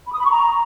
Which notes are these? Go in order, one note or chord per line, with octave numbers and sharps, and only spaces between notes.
B5
D#6
B5
C#6
A#5